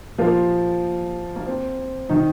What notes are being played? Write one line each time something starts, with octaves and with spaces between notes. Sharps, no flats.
A#2 F3 A#3 F4 G4 A#4
A#3
C4
D#3 D#4